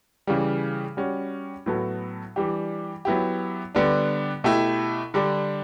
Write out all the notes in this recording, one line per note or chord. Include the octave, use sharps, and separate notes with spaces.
C#3 E3 G3
G3 C#4 F#4
A2 F#3 B3 F#4 A4
E3 G3 D4 G4
F#3 B3 E4 G4
D3 G3 B3 D4
B2 A3 E4 G4
D3 G3 D4